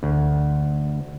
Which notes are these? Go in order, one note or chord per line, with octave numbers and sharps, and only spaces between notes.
D2